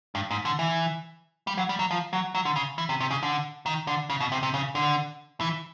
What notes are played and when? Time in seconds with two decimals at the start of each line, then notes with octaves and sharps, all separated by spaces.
0.15 G2
0.31 G#2
0.45 D3
0.59 E3
1.47 G3
1.58 F#3
1.69 G3
1.79 F#3
1.91 F3
2.13 F#3
2.35 F#3
2.45 D3
2.56 C#3
2.78 E3
2.89 C3
3.00 C3
3.11 C#3
3.23 D3
3.66 D#3
3.87 D3
4.10 C#3
4.20 B2
4.32 C3
4.43 C3
4.54 C#3
4.75 D3
5.41 E3